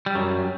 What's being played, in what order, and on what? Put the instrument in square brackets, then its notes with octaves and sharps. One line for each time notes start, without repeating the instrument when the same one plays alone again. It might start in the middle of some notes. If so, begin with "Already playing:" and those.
[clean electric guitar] G3
F#2 F#3